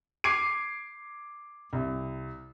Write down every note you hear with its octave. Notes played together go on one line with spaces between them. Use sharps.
D6 G#6 C7 D7
C2